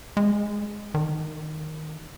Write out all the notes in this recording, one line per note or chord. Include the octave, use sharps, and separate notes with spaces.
G#3
D#3